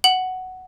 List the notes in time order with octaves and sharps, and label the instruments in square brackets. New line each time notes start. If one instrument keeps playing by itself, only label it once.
[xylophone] F#5 F#7